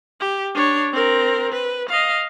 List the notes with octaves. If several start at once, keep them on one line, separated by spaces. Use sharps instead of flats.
G4
D4 C#5
C4 A#4
B4
D#5 F5